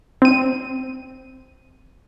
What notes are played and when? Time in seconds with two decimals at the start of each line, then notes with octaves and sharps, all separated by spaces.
0.22 C4 D#7